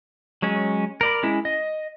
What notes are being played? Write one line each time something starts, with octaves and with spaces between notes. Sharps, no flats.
F#3 G#3 C#4
A#4 D5 B5
G#3 C#4 E4
D#5